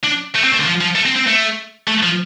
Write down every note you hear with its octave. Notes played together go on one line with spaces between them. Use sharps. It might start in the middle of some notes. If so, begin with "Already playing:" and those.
D4
A3
C4
A3
D3
F3
F3
A3
C4
C4
A3
A3
F3